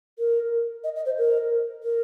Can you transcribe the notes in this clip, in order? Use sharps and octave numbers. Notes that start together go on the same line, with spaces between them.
A#4
D#5
D#5
C5
A#4
A#4